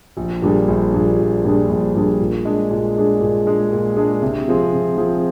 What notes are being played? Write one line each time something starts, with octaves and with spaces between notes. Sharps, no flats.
A#1
A#2 G3 D4 G#4
A#1
A#2 G3 D4 G#4
A#1
A#2 G3 D4 G#4
A#1
A#2 G3 D4 G#4
A#2
G#3 D4 G#4
A#2
G#3 D4 G#4
A#2
G#3 D4 G#4
A#2
G#3 D4 G#4
C3
F3 C4 F4 G#4
C3
F3 C4 F4 G#4